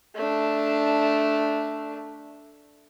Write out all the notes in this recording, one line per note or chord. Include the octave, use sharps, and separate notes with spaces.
A3 D4